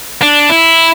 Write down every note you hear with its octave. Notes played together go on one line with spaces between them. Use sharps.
D4
E4